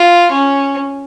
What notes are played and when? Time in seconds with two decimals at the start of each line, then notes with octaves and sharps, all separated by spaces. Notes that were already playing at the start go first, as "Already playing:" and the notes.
Already playing: F4
0.32 C#4